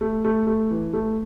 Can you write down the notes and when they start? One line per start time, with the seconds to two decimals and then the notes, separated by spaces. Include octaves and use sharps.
0.01 A3
0.25 A3
0.47 A3
0.71 E3
0.93 A3